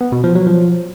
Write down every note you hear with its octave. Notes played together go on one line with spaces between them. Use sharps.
B3
B2
F3
F#3
F3